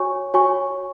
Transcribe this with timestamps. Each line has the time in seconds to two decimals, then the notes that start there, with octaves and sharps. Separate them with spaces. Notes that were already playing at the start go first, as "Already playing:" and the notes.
Already playing: F#4 C#5 G#5 C#6
0.34 F#4 C#5 G#5 C#6